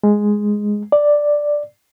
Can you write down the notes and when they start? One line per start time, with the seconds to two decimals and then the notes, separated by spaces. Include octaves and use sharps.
0.03 G#3
0.92 D5